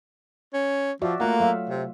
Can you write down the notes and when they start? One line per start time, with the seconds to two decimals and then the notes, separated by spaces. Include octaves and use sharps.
0.54 C#4
1.02 F3 F#4 D5 E5
1.20 A3 A#3 F4 F#5
1.40 F#3 E5 F5
1.69 C3